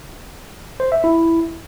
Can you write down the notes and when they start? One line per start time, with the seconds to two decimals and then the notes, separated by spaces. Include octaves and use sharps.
0.80 C5
0.92 E5
1.04 E4